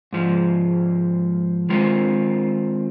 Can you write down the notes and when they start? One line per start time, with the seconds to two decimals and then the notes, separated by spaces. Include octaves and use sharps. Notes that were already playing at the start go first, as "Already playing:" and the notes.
0.13 G#2 F3 G#3
1.69 D#3 G#3 C4 F4